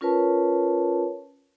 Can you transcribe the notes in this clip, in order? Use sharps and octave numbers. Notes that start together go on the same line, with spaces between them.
C#4 F4 A#4 B4 C#5 A5